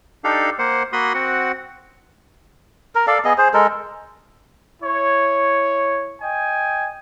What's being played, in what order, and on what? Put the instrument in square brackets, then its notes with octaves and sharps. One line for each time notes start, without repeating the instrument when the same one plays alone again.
[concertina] D4 D#4 G4 A4 F5
A#3 C5 F#5
A#3 F#4 B5 C6 D#6
C4 F#4 F#5
[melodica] A#4
A4 D5 F5
B3 G#4 D#5
G#4 C5
G#3 A4 A#4
[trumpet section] E4 C#5
D#5 G5 G#5